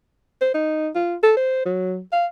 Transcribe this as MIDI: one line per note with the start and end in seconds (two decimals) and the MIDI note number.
0.41 0.50 72
0.54 0.90 63
0.95 1.16 65
1.23 1.33 69
1.37 1.62 72
1.66 2.00 54
2.12 2.26 77